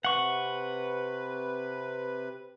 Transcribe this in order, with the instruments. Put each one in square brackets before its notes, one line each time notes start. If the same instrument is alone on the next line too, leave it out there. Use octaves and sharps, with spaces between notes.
[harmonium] C3 B4 [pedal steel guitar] F#5 C#6